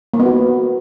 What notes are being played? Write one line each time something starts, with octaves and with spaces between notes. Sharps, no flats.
A#3
B3
F#4